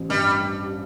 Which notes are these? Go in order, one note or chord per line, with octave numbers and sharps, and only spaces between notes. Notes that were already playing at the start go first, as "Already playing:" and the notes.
Already playing: A1 F3 C4
G2 G3